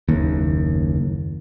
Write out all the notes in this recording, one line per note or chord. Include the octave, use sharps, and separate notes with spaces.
F#1 D#2